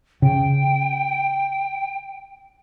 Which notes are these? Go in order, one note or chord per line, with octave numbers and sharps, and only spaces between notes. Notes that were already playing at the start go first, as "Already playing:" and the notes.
C#3 G5